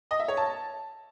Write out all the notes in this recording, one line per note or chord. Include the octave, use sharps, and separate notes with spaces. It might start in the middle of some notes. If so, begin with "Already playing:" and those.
D#5
E5
C#5
A5